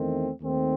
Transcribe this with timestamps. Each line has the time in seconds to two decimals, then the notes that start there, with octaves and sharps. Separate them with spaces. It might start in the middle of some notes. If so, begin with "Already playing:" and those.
Already playing: E2 D#3 A3 C4
0.40 D#2 D#3 A3 C4